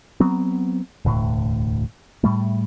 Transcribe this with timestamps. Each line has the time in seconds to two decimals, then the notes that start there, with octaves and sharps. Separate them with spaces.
0.20 F#3 B3 C4
1.05 E1 D2 A2
2.23 A2 G3 A3